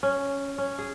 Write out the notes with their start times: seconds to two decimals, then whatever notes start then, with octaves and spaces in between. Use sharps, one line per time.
0.03 C#4
0.58 C#4
0.79 G#4